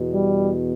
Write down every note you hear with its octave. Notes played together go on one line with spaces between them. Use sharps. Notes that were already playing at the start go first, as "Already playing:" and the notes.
Already playing: E2 B2
G3